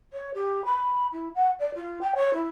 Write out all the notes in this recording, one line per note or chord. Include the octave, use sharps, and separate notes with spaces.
C#5
G4
B5
E4
F#5
D5
F4
G5
C#5
E4